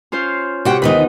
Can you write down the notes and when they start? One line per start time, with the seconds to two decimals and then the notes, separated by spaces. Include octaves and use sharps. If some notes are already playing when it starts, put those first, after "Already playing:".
0.12 C#4 F4 C5
0.65 C3 F#4 F#5 G5
0.82 D2 D#3 B3 D#4 B4